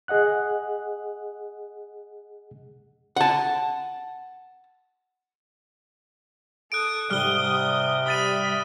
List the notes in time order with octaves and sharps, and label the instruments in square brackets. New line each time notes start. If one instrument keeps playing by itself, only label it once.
[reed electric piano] G#4 D#5 F#5 F#6
[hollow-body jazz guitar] F#5 A5
[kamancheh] A4 D#6 [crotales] F#6 D7
[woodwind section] G#2 C3 [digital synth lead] G3 [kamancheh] D#6 [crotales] F6 G7
[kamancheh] E5 B5 [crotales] D#6 A6 D#7